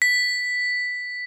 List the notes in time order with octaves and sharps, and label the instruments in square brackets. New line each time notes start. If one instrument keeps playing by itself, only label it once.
[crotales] B6